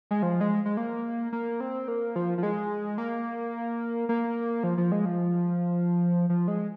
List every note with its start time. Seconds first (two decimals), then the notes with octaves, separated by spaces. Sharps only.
0.11 G#3
0.22 F3
0.41 G#3
0.66 G#3
0.77 A#3
1.33 A#3
1.60 C4
1.88 A#3
2.16 F3
2.38 F3
2.43 G#3
2.98 A#3
4.09 A#3
4.64 F3
4.78 F3
4.92 G#3
5.05 F3
6.30 F3
6.48 G#3